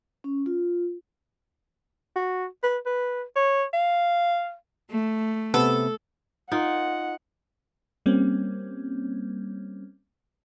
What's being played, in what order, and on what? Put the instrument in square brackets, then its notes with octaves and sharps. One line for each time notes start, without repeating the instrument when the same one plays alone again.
[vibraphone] C#4
F4
[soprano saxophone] F#4
B4
B4
C#5
F5
[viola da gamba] A3
[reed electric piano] C3 B3 [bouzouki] A4
[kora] D#4 F4 A#4 [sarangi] F#5
[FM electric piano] G3 A#3 C4 C#4